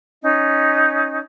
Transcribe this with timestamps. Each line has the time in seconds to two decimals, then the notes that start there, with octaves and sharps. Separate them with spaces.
0.22 C#4 D#4